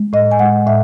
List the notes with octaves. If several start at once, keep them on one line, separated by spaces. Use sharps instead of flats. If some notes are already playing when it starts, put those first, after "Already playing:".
Already playing: G#3
A2 D#5
G#5
G#3 F#5
A2 E5